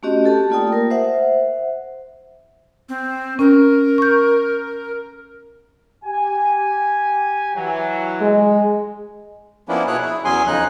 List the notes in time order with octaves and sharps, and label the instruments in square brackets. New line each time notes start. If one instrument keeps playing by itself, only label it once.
[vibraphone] A3 C4 C#4 F#4 G4 D#5
G4 A4 A5
A3 A#3 F4 D5 G5 D#6
A#4
C5 E5 F#5
[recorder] C4
[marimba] C#4 [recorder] A#4
[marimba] C#6 G6
[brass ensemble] G4 G#5
E3 F#3
[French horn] G#3
[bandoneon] F3 A#3 B3 C#4 D4 E4
B2 E4 G#4 C#5 F#6
E4
E2 F#3 C#4 G#4 G#5 C6
F2 C#3 D#4 F#6